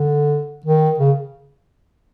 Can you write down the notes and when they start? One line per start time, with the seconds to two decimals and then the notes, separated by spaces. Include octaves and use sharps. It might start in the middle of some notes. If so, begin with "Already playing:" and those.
Already playing: D3
0.65 D#3
0.99 C#3